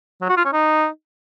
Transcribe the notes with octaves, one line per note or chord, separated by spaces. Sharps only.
F#3
F#4
F4
C#4
D#4